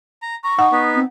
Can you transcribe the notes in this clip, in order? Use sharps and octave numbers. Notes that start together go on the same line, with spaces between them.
A#5
A#5 C#6
D#4 F#5
B3 D#4
C4